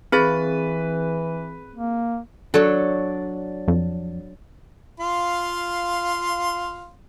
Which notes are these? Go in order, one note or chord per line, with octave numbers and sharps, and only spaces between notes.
E3 C4 G#4 B4 A6
A#3
F#3 D4 A4 C#5
F2
F4 F5 C6